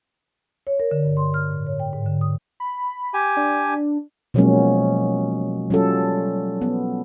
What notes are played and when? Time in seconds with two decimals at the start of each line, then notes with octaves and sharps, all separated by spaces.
0.67 C#5
0.80 A#4
0.91 D3
1.05 G2
1.17 C6
1.34 F6
1.51 A2
1.66 C#5
1.80 G5
1.93 G#2
2.06 D3
2.21 D#6
2.60 B5
3.14 G4 G#5
3.37 D4
4.34 B2 F3 F#3 G#3 A#3 C#4
5.70 F#3 G3 C#4 F4 A4
6.62 B3